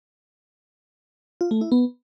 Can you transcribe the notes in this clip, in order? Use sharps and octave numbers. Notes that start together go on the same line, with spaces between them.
F4
A3
E4
B3